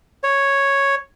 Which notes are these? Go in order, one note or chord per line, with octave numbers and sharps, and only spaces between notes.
C#5